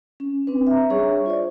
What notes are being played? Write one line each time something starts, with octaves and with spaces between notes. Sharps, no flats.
C#4
C4 D4 B4
E5 A#5
G3 D4 G#4 C#5 E5 C#6
F4 C5 D5